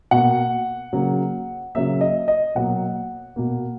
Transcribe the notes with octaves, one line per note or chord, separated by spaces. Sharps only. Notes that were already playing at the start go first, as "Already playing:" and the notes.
B2 A#3 F#5
C#3 F#3 A#3
C#3 F#3 A#3 E5
D#5
D#5
B2 F#3 A#3 F#5
B2 A#3